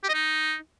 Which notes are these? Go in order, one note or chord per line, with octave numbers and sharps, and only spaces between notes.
G4
D#5
D#4